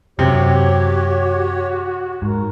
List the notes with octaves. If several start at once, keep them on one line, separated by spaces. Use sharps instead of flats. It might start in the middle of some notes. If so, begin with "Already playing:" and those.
F#2 C3 F#4 G4 C#5
G#2 A#4